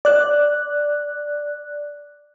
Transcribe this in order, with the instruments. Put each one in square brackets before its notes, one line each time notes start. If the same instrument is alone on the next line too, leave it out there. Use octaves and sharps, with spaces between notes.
[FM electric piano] D5 F#6